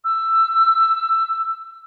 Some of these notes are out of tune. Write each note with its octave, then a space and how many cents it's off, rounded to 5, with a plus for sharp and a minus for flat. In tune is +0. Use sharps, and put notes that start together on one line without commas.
E6 +15